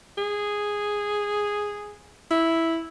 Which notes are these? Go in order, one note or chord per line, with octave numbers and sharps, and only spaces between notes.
G#4
E4